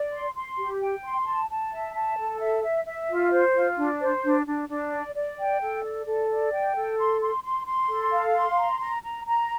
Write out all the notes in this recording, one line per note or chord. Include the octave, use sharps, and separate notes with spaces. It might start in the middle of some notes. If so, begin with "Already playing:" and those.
Already playing: D5
C6
C6
G4
G5
C6
A5
A5
E5
A5
A4
E5
E5
E5
F4
C5
F4
D4
C5
D4
D4
D4
D5
D5
G5
A4
D5
A4
D5
G5
A4
C6
C6
C6
C6
A4
F5
C6
A#5
A#5
A#5
A#5